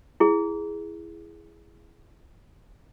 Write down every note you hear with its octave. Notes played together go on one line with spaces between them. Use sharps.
E4 G#4